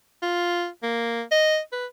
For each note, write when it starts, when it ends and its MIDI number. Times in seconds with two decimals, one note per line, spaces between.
0.22 0.67 65
0.83 1.22 58
1.31 1.59 75
1.72 1.86 71